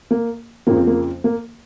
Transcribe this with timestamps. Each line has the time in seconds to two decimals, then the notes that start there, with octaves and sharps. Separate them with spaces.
0.11 A#3
0.67 F2 C#3 F3 A#3
0.77 C4
0.87 A#3
1.24 A#3